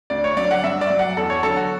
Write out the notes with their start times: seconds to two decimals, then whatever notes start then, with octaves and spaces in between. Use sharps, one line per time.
0.10 D2 D5
0.24 C#5
0.37 D3 F#3 D5
0.51 F#5
0.64 G2 E5
0.81 D5
0.90 F#3
0.99 F#5
1.17 E2 A4
1.30 C#5
1.43 D3 F#3 A4
1.56 F#4